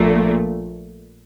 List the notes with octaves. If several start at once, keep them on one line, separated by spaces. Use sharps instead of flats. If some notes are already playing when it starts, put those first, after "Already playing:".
Already playing: A#1 A#2 A3